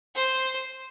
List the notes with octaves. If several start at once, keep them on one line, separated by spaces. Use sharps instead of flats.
C5